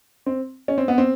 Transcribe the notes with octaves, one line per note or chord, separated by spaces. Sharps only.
C4
C#4
C4
B3
C4